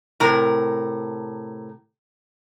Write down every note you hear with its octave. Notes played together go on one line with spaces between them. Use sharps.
A2 C3 A#4